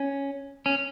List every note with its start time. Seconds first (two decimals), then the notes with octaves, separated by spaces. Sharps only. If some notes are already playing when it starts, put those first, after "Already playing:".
Already playing: C#4
0.66 C#4